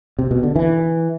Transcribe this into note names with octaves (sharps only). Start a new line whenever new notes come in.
C3
B2
D3
E3